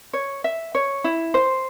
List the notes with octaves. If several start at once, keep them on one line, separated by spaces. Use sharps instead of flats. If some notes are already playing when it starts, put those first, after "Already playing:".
C#5
E5
C#5
E4
C5